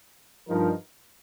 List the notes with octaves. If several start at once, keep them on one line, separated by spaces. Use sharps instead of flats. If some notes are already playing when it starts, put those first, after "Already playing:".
G2 F3 D#4 A#4